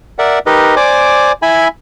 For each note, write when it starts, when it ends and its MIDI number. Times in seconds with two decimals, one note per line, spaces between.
0.19 0.39 70
0.19 0.39 74
0.19 0.39 76
0.19 0.39 78
0.46 0.75 63
0.46 0.75 67
0.46 0.75 70
0.46 0.75 71
0.46 0.75 75
0.76 1.32 72
0.76 1.32 74
0.76 1.32 80
0.76 1.32 86
1.42 1.68 64
1.42 1.68 76
1.42 1.68 80
1.42 1.68 83